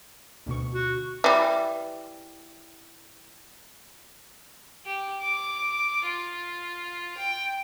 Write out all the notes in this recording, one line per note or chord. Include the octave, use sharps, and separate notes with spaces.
D2 B2 C#6
F#4
E3 G3
G4
D6
F4
G5